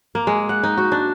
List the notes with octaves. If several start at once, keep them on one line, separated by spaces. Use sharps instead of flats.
A#3
G#3
F#5
D#4
F#4
D4